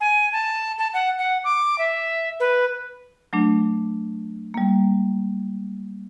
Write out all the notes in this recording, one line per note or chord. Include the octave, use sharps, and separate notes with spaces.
G#5
A5
A5
F#5
F#5
D6
E5
B4
F#3 A3 D4
G3 A#3